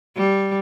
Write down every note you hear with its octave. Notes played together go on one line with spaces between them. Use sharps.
G3